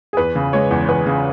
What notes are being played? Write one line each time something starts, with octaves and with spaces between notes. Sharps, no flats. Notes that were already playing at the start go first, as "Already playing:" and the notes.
G#4
E2 B4
C#3
G#3 C#5
E2
E2 B4
C#3